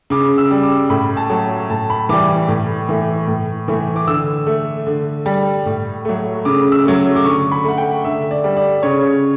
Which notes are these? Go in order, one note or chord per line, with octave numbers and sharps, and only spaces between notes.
C#3 D6
E6
G3
D6
A2 B5
A5
F#3 A3
A2 A5
B5
E3 G3 D6
A2
E3 A3
A2
E3 A3
D6
D3 E6
A3
D3
G3
A2
F#3 A3
C#3 D6
E6
F#3 A3
D6
D3 C#6
B5
A3 F#5
G5
D3 E5
D5
G3
D5
C#3 C#5